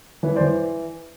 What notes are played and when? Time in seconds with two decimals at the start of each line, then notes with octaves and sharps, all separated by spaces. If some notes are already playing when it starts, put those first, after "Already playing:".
0.23 E3 B4 C#5
0.36 C5 D5
0.41 E3